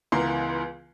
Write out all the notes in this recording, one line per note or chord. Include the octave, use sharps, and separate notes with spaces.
C#2 E3 B3 A#4 F5 C6